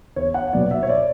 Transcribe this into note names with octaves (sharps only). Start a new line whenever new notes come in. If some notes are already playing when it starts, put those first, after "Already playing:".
E2 C#5
F#5
B2 F#3 B3 D5
E5
C#5
D5